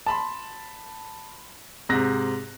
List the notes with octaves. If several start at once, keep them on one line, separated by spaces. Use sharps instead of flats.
A5 B5 C6
G#2 C3 F#6 A#6